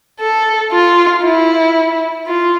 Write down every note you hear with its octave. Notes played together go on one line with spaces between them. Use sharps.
A4
F4
E4
F4